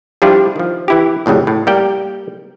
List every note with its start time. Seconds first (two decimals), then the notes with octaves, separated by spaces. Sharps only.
0.22 F3 G3 D4 E4 F4 G4
0.56 D#3 F3
0.88 E3 E4 G4
1.26 F2 A2 C#3 F#3 G3
1.47 A2
1.67 G3 A#3 G4 D5 G5